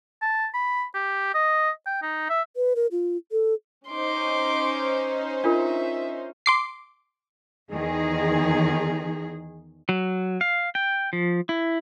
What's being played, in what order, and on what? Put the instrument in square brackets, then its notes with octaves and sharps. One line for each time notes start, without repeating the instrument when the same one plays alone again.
[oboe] A5
B5
G4
D#5
G5
D#4
E5
[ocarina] B4
A#4
F4
A4
[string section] C#4 D#4 C5 [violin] C6 D6
[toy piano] D4 F4 A#4 [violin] E5
[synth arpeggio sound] C6 D6 C7
[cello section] E2 D#3 G#4
[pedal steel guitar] F#3
F5
G5
F3
E4